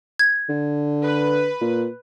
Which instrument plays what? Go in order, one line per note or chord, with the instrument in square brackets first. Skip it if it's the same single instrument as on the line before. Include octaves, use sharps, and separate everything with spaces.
[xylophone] G#6
[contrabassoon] D3
[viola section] B4
[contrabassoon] A#2